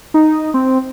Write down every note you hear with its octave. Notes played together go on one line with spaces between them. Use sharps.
D#4
C4